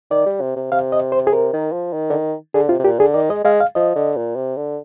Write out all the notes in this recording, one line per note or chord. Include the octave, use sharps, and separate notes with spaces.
D#3 D5
G3
C3
C3
C3 F5
D#5
C5
G#4
C3 A#4
D#3
F3
D#3
D3
D#3
D3 G#4
C3 F4
C3
A#2 G4
D3 G#4
D#3 D5
G#3 D#5
G#3 F5
F5
F3 D#5
D3
A#2
C3
D3